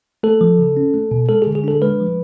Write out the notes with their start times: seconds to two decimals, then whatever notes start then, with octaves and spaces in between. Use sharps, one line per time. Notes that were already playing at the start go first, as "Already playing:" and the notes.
0.23 A3 A4
0.41 F3
0.59 C#3
0.77 C#4
0.94 A3
1.11 B2
1.29 G#3 A4
1.42 G#4
1.47 D3
1.55 G#4
1.64 D4 A4
1.82 G#3 B4
2.00 F3